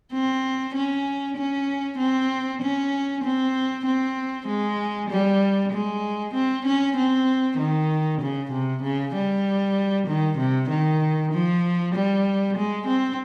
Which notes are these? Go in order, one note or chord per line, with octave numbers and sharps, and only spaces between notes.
C4
C#4
C#4
C4
C#4
C4
C4
G#3
G3
G#3
C4
C#4
C4
D#3
C#3
C3
C#3
G3
D#3
C3
D#3
F3
G3
G#3
C4